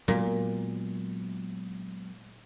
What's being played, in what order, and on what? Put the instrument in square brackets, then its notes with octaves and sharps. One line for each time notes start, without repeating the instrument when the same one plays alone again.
[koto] A#2 [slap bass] F#3 G#3 B3